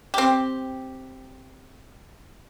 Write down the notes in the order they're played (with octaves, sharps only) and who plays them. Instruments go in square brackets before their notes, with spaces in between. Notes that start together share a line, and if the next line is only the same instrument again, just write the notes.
[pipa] C4 G4